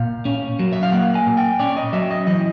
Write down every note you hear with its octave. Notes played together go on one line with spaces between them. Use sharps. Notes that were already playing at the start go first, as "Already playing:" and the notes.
Already playing: A#2 F5
C#4
F#3
E5
F5
A#3 F#5
G#5
A#2
G5
C#4 D5
D#5
F#3 E5
D#5
E3 D#5